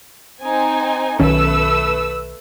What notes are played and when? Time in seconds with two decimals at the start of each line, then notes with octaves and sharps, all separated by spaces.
0.43 C4 D#4 G#5
1.20 B1 D#3 A3 C#4 B4 E6